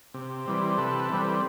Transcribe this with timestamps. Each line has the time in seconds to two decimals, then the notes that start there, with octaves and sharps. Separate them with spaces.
0.14 C3
0.46 E3 G3 C4
0.77 C3 A4 B4
1.09 E3 G3 C4